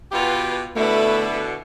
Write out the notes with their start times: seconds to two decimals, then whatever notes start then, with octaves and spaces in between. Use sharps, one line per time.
0.12 B2 F4 G4 B4
0.76 B2 D3 A3 E4 B4